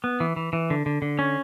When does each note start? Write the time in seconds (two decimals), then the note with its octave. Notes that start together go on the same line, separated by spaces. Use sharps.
0.04 B3
0.20 E3
0.36 E3
0.53 E3
0.70 D3
0.86 D3
1.02 D3
1.19 C#4